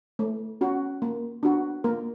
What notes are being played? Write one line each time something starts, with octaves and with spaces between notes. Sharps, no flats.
A3
C#4 F#4
A#3
D4 F#4
A#3 A#4